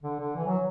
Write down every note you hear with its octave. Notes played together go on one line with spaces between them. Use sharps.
D3
D3
E3
F#3